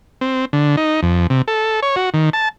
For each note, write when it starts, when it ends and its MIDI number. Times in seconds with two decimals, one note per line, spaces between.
0.21 0.45 60
0.53 0.76 50
0.77 1.01 63
1.03 1.27 41
1.30 1.42 48
1.48 1.80 69
1.83 1.96 73
1.96 2.10 66
2.14 2.30 51
2.33 2.49 81